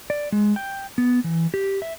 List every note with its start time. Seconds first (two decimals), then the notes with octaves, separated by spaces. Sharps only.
0.10 D5
0.32 G#3
0.56 G5
0.98 B3
1.24 E3
1.54 G4
1.82 E5